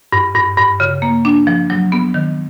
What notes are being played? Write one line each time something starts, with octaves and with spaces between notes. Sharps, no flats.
G2
G2
G2
C#3
A#3
D4
F3
F#3
B3
D#3